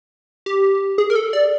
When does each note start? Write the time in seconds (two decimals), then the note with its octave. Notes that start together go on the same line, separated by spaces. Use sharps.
0.46 G4
0.98 G#4
1.10 A#4
1.15 A4
1.33 D5